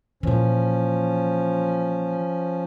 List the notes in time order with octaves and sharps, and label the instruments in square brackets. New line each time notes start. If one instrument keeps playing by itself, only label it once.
[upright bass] A#2 E3 [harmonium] F3 C#4